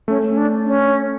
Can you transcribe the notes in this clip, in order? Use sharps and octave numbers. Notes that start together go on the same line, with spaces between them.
A3 C#4
C#4
D4
C#4